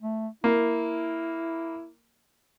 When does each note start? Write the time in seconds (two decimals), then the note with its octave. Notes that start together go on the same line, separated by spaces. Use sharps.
0.02 A3
0.44 A#3 E4